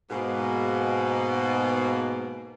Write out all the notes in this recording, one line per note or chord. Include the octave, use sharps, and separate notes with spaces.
G#2 B2 A#3